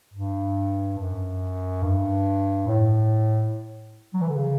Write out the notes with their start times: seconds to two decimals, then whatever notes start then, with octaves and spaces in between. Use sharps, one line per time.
0.14 G2
0.98 F#2
1.83 G2
2.67 A2
4.14 F#3
4.21 E3
4.29 D3
4.36 C#3